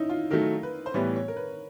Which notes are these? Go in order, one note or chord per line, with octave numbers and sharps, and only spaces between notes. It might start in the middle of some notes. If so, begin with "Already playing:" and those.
Already playing: C#4 D#4 E4
F4
D#3 F#3 A3 A#4
B4
C5
A2 E3 G3 B3 C#5
C#5
A#4
B4